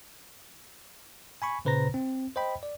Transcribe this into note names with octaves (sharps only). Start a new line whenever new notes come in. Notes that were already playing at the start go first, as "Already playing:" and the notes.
G#5 B5 C#6
A#2 C#3 B4 C5 A#5 A#6
C4
C5 D#5 G5 B5
D5